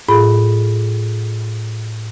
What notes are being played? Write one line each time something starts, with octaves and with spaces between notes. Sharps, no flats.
A2 F4 G#4 B5